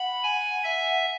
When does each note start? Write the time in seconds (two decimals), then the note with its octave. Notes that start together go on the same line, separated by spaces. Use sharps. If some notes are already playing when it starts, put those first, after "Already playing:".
Already playing: F#5 B5
0.23 G#5
0.63 E5